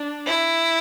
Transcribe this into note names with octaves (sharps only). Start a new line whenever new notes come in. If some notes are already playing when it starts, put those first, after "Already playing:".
Already playing: D4
E4